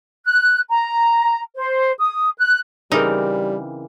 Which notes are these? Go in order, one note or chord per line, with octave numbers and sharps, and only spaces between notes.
F#6
A#5
C5
D#6
F#6
C#3 E3 G3 C4 D#4 A#4 D6